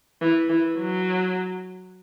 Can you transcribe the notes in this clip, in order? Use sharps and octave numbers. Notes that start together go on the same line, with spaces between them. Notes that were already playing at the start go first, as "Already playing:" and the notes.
E3
E3
F#3